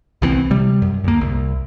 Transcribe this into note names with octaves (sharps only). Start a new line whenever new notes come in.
C2 E3 F3 C4
C3 G3
F#2
D2 A#3
C2